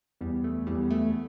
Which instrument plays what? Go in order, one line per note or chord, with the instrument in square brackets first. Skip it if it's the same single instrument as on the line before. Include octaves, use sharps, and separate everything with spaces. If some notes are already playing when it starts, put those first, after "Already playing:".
[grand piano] E2 [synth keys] G3
[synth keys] A3
[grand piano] E2 [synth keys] G3
[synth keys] A3